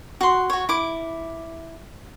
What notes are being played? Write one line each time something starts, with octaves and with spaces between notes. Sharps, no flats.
F#4 C6
F#4 C#5
E4 D6